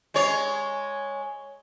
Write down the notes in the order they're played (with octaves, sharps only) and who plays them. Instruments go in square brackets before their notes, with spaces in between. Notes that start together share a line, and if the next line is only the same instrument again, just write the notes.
[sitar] G#3 C#5